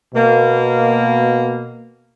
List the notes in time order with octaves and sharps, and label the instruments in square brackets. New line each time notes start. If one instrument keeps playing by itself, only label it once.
[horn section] B2 A#3